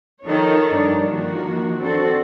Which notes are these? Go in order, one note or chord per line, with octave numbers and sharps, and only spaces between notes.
D#3 F3 D#4 A4 C#5
G2 D4
D#3 F3 A#3 F#4
C4 D4 F#4 A4